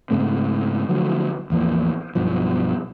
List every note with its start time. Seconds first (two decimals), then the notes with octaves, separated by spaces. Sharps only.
0.10 G#2 C#3 A3 C4
0.89 D3 F3 F#3 A3
1.50 A1 E2 F3 A#3
2.15 B1 G2 B2 F3